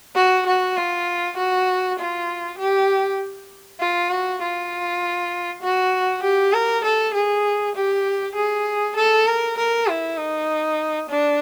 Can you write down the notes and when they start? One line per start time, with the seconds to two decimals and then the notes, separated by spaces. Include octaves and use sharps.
0.16 F#4
0.47 F#4
0.77 F4
1.37 F#4
1.99 F4
2.59 G4
3.80 F4
4.10 F#4
4.42 F4
5.63 F#4
6.23 G4
6.53 A#4
6.84 A4
7.14 G#4
7.75 G4
8.36 G#4
8.96 A4
9.27 A#4
9.58 A#4
9.88 E4
10.17 D#4
11.10 D4